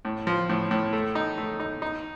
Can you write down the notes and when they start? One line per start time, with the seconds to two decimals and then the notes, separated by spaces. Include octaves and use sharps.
0.05 A2
0.27 F3
0.49 A2
0.71 A2
0.93 A3
1.15 D#4
1.38 A3
1.60 D#4
1.82 D#4